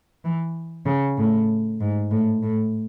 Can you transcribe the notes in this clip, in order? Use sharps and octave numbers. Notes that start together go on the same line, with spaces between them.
E3
C#3
A2
G#2
A2
A2